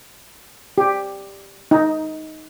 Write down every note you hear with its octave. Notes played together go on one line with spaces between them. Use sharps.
G4
D#4